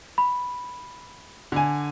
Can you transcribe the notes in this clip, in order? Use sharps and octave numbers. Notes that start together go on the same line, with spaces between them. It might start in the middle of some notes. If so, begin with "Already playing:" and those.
B5
D3 G#5